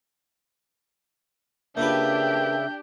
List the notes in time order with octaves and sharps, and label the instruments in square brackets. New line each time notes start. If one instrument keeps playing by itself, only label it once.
[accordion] C#3 E5 [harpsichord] A#3 F4 B4 [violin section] D4 G4 [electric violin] G6